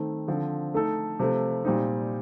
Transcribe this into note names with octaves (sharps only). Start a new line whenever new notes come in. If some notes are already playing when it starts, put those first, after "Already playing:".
Already playing: D#3 A3 C4
D3 F3 C4
A3 D#4 A4
C3 F3 A3
A#2 G3 C4 D#4